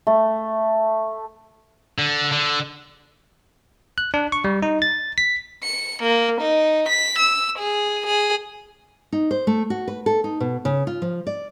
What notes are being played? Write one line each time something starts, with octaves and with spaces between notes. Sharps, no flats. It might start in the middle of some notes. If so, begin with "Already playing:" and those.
A3
D3
D3
F#6
D4
C#6
G3
D#4
A6
B6
C#7
A#3
D#4
B6
E6
G#4
G#4
D#4
C5
A3
F#4
B4
A4
D#4
B2
C#3
F4
F3
D5